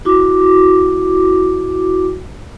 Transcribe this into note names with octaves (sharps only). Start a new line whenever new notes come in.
E4 F#4 D6